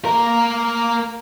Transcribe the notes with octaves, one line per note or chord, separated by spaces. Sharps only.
A#3 A#4